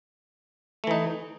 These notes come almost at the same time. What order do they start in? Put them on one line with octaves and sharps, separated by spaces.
A3 E3 D#4